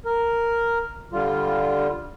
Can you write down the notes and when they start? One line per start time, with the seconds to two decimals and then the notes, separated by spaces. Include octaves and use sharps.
0.05 A#4
1.12 D3 G3 F4